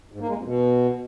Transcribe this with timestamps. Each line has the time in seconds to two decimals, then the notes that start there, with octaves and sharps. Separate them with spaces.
0.12 G#2
0.20 A#3
0.28 G#3
0.36 F2
0.44 B2